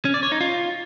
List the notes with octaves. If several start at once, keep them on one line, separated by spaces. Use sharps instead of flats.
C#4
D5
C#5
D#4
F4